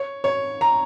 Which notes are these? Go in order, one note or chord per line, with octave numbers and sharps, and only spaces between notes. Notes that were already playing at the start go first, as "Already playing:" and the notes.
Already playing: C#5
C#5
A#5